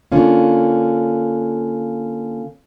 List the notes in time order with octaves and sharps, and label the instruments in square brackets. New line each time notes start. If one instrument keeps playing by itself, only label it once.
[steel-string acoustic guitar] D3 A#3 C#4 F4